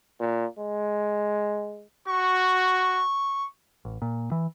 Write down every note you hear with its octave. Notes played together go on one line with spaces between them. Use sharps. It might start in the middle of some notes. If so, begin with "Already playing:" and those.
A#2
G#3
F#4 C#6
A1
A#2
E3